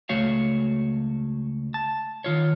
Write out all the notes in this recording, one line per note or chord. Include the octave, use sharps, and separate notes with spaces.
C#2 A3 F#4 C#5 F5
A5
D#3 F4 C#5